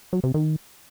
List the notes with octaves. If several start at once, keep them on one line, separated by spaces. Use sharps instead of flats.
F#3
C3
D#3